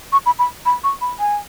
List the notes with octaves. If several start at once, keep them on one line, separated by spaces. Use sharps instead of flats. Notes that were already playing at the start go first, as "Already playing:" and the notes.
C#6
B5
B5
B5
C#6
B5
G#5